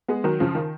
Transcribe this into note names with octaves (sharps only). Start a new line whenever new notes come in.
G#3 B3
D#3 F#3
C#3 F3
D#3